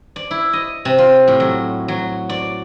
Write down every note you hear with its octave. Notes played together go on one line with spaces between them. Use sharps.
D5
E4
D#5
C3
F4
A2
F#3
F#3
D5